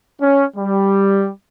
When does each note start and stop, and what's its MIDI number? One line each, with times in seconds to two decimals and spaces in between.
0.20 0.45 61
0.56 1.29 55